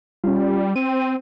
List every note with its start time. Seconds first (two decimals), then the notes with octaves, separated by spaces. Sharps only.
0.24 G3 C#4 F4
0.76 C4 D#7